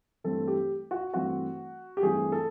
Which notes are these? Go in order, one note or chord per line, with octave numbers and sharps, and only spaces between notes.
G2 E3 A3 C4 A4
G4
F#4
G2 E3 A3 C4 F#4
G4
G2 E3 A3 C4 G#4
A4